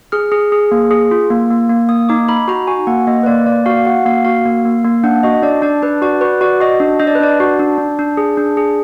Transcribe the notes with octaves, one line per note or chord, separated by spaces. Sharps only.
G#4 F6
G#4
G#4
A#3
G#4
F4
A#3
A#3
A#3
A#3 D#6
D#4 D6
D#4 B5
F#4 A#5
F#4 G#5
A#3 F#5
A#3 D#5
B4
A#3 D5
A#3 D5
F#4 F5
F#4 F#5
A#3 F5
F#4 F5
A#3
A#3
A#3
D4 F#5
F#4 D#5
D4 D5
D4 D5
D4 B4
F#4 D5
F#4 B4
F#4 D5
F#4 D#5
D4
D4 D#5
D5
B4
D4 D5
F#4
D4
D4
D4
G#4
D4
G#4